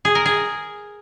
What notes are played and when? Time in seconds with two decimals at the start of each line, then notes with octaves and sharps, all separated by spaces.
0.05 G#4
0.15 A#4
0.25 G#4